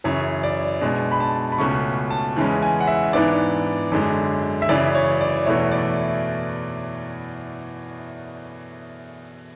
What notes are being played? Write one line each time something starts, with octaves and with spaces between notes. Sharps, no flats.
F#2 C#3 E3 C#5
D5
B2 G#3 D4
B5
A5
B5
C#2 B2 A3 C#4 C#6
A5
E2 C#3 E3 G#3 C#4
G#5
F#5
E5
G#2 E3 B3 D4 D5
F#2 D3 G#3
E5
F#2 C#3 E3 D5
C#5
D5
E2 B2 A3 E4 C#5
D5